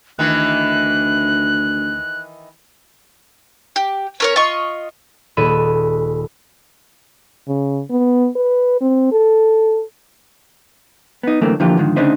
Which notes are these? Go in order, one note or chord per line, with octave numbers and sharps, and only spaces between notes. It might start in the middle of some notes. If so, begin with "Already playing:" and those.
D2 D#3 E3 F#6
G4
C#4 A#4 C#5
F4 D#5 C#6
D#1 G#4 A4 B4 D#7
C#3
B3
B4
C4
A4
B3 D#4
D3 E3 F#3 A3 A#3 C4
D3 E3 F3 A#3 F4 G4
G#2 D3 D#3 F3
D2 C#3 D4 D#4 C5 E5